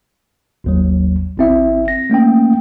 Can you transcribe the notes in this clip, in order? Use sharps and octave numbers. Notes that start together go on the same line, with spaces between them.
G#1 D#2 F#3
G#1 C4 E4 E5
A#6
A3 A#3 C#4 G5